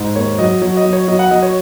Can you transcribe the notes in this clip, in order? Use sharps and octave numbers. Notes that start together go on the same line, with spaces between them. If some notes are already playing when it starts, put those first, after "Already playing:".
Already playing: G#2
D#2 C#5
F#3 D#5
F#3 C#5
D#5
F#3
C#5
F#3 D#5
F#5
F#3 D#5
C#5